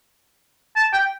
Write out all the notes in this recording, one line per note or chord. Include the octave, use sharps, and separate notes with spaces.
A5
G5